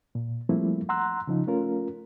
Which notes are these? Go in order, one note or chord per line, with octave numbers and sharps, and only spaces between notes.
A#2
F3 G3 A3 A#3 C4 E4
F#5 A#5 C6 E6 F#6
C#3 F3 D#4
A3 C#4 F4 A#4